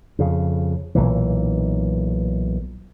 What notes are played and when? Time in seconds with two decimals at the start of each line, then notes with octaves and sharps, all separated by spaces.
0.19 F2 C#3
0.95 B1 A#2 E3